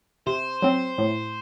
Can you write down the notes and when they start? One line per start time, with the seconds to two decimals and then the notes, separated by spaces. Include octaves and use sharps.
0.27 C3 C5
0.62 F#3 C4
0.98 A2